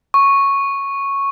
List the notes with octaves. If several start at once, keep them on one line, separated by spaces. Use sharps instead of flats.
C#6